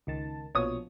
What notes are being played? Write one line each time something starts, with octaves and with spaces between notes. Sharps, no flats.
C#2 D#3 A5
A#1 B2 F3 C#5 D#6